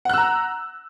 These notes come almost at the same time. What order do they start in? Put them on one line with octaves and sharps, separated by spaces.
F#5 F#6 E6 A#5